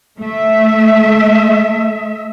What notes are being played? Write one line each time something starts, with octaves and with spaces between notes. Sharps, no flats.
A3 E5